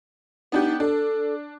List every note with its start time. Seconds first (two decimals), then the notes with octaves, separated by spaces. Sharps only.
0.52 B3 D4 D#4 G4
0.80 D4 A4